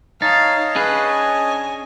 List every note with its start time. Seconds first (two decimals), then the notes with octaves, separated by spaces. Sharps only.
0.22 D#4 C#5 D#5 F5 A5 A6
0.76 C#4 D4 G#4 B4
1.09 G#5